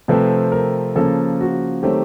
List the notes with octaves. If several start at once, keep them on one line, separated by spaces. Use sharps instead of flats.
C3 F3 A3 C4 B4
A#4
C#3 F3 A#3 A4
F#4
D#3 F#3 A3 C4 G4